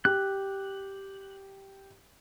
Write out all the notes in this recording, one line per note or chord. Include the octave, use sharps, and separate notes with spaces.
G4 F#6